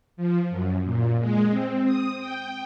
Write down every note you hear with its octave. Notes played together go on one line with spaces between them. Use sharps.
F3
F#2
A#2
G#3
C4
D#6
G5